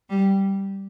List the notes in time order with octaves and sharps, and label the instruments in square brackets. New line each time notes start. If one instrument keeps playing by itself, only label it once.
[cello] G3